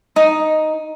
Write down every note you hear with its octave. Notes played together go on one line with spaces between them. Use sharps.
D#4